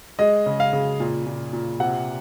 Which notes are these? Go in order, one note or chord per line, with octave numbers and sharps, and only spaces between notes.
G#3 D#5
C#3
F5
C#3
A#2
A#2
A#2
C3 F#5